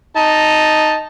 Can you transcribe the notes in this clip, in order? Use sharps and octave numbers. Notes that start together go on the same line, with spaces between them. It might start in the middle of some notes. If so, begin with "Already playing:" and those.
D#4 A5